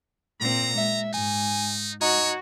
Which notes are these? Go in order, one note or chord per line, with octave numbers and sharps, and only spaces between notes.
A#2 C4 A#5
G#3 E5
G#2 D#4 G#5
D#4 F#4 C#5